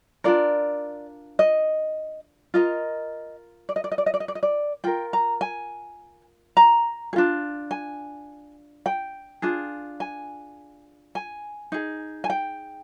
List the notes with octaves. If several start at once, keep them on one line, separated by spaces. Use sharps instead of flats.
D4 F4 A#4 D5
D#5
F4 A#4 D#5
D5
D#5
D5
D#5
D5
D#5
D5
D#5
D5
D#5
D5
F4 A#4 G5
A#5
G#5
A#5
G#4
D4 F4
G#5
G5
D4 F4 G#4
G#5
G#5
D#4 G#4
G#5
G5